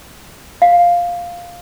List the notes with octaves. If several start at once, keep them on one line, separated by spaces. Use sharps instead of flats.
F5